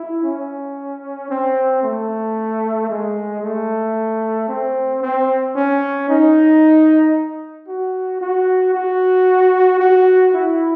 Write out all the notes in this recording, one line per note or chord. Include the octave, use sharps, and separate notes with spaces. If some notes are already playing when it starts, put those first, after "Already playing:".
Already playing: E4
C#4
C4
A3
G#3
A3
C4
C4
C#4
D#4
F#4
F#4
F#4
F#4
E4